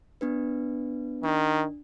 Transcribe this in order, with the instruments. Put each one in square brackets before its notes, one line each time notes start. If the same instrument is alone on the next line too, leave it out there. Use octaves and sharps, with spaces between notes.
[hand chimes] B3 D4 B4
[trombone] D#3 [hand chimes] D4